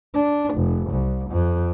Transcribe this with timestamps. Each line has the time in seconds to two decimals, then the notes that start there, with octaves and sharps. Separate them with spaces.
0.14 D4
0.54 F1
0.90 C2
1.30 F2